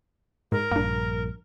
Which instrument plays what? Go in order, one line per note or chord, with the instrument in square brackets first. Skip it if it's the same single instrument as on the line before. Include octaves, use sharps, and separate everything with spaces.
[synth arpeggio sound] G#2 [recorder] A#4
[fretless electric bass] A#1 G2 [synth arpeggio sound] A#3 D4